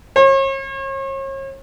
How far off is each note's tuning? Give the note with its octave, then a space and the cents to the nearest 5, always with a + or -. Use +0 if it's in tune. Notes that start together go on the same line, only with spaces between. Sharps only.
C#5 -40